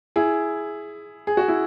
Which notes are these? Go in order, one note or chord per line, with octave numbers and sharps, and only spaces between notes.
E4 G#4
G#4
F#4
E4